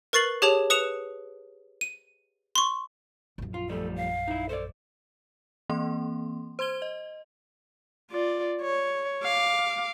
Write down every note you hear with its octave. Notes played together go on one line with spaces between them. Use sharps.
A#4 B4 C#6 A6 C7 F#7
G4 G#4 C#5 A5 F7
B4 D#6 C#7 E7 F7
D#7
C6 C#6
A#1 F#2
F4
F3 G3 A3 A4
F5
D#4 E4
A4 C5 D5
E3 A#3 C4 C6
C5 C6 G#6 G7
D#5
F4 D5
C#5
F5 D6